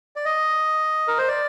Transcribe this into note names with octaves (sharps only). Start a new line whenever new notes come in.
D5
D#5
A#4
C5
D5